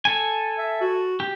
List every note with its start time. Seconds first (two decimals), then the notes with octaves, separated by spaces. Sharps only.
0.05 A4 G#5
0.58 E5
0.81 F#4
1.20 G4